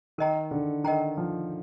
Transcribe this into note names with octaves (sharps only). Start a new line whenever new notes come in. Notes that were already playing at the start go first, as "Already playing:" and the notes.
D#3 A#4 D#5 G5 A#5
D3
D#3 A#4 D#5 G5 A#5
F3